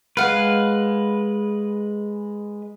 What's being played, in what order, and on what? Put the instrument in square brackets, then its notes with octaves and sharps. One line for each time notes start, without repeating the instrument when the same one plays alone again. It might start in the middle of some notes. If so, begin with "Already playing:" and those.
[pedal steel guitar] G#3 B4 [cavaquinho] F5 F#5